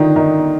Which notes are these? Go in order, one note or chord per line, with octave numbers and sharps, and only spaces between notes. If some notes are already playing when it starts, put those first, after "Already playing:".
Already playing: D3 D#3 D4 D#4 F4
D#3 D#4